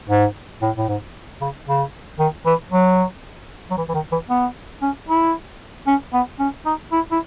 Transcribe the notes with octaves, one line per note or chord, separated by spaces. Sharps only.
G#2
A2
A2
G#2
C#3
C#3
D#3
E3
F#3
F#3
E3
E3
D#3
E3
B3
C#4
E4
C#4
B3
C#4
D#4
E4
E4